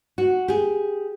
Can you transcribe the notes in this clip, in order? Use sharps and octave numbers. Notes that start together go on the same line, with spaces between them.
F#4
G4 G#4